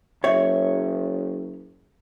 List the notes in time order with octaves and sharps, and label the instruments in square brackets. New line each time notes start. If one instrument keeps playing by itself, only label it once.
[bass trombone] F#1 [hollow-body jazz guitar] C#5 E5